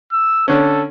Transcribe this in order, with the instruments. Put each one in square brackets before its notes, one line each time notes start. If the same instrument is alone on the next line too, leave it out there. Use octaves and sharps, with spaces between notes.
[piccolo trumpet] E6
[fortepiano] D3 C#4 [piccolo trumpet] A4